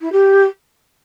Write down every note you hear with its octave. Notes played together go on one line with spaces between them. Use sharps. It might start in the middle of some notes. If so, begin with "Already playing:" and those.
E4
G4